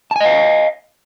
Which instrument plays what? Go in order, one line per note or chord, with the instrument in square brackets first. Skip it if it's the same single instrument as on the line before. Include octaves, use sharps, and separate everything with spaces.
[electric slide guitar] A5
G#5
D#5
F5